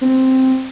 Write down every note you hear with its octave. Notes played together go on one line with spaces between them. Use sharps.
C4